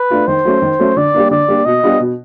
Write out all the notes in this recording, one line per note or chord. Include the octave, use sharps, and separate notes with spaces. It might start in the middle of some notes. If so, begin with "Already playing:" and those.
Already playing: B4
A3 D4 F4
D#3 C5
F#3 A3 C#4
D#3
F#3 A3 C#4
D3 D5
G3 A#3 D4
D3 D5
G3 A#3 D4
B2 D#5
G3 B3 D4 F4
B2